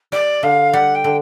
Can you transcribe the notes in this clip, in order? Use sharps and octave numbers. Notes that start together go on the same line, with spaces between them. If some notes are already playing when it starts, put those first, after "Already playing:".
G3 D5
D3 F5
G3 F#5
G5
D3